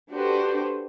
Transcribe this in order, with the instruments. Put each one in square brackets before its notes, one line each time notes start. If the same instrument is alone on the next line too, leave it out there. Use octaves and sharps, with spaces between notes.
[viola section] D4 F#4 G4 A4 B4 C5